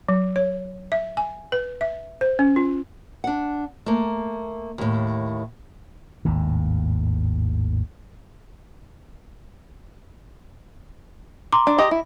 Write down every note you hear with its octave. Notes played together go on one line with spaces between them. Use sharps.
F#3
C#5
E5
G#5
B4
E5
C5
C#4
F4
D4 F#5
A3 A#3
D#2 A2
G#1 D#2 A2
A#5 C6 D6
D4
G4 D#5
E4